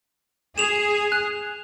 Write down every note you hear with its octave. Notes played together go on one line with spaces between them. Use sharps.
G#4 E7 F7
F#6